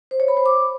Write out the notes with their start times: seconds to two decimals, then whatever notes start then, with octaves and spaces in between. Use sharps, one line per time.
0.11 C5
0.20 C#5
0.28 B5
0.37 C5
0.46 D6